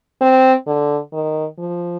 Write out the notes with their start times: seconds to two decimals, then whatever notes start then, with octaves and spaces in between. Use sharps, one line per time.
0.21 C4
0.67 D3
1.13 D#3
1.59 F3